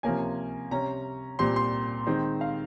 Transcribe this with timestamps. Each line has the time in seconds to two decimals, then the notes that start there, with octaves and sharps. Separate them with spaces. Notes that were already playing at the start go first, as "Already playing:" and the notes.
0.03 C3 F3 A#3 C#4 G#5
0.71 C3 G3 C#4 A#5
1.39 A#2 G3 C4 C6
1.56 C6
2.07 D#3 G#3 C4
2.41 F5